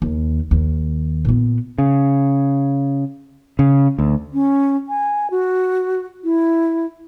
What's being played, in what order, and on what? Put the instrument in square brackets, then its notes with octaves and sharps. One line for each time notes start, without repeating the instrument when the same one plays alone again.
[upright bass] D#2
D#2
A#2 B3
[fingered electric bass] C#3
C#3
D2
[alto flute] C#4
G#5
F#4
E4